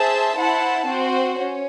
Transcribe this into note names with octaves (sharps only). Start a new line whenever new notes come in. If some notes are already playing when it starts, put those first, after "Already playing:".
Already playing: G#4 C5 E5 A5
E4 C5 F#5 A5
C4 F#4 C5
C#4